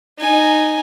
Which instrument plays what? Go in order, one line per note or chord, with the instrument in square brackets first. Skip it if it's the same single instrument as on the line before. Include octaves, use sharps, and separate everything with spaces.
[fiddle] D#4 G#5